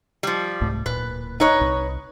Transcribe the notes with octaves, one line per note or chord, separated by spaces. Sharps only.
F3 G3
C2 G#2 A3
D1 A#2 B4
D#4 B4 C#5
C2